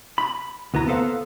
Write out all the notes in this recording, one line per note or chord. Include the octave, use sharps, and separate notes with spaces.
B5
D2 B3 E4 A#5
A#3 B3 A4 C5 F5 F#5